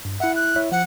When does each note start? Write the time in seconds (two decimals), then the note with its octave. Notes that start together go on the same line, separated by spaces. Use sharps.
0.05 G2
0.20 E4 E5 F#5
0.36 F#6
0.56 E4 C#5 E5
0.72 F3 F#5